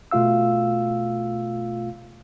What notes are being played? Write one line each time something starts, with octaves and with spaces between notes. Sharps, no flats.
B2 A3 F4 F5 E6